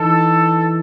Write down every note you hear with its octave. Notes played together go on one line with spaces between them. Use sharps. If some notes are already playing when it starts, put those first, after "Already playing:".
Already playing: E3 D#4 A4